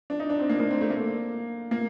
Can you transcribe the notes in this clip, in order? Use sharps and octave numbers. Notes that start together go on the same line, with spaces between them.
D4
D#4
D4
C4
A#3
A#3
C4
A3
A#3
A#3